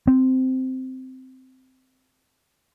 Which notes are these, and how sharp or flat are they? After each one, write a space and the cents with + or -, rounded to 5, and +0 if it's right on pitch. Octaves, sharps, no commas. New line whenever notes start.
C4 -10